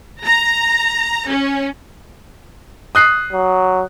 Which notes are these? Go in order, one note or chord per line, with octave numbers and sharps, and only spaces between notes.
A#5
C#4
D#6 F#6 C7
F#3